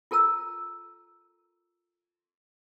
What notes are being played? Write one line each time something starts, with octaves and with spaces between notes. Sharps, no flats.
F4 A4 A#4 A#5 E6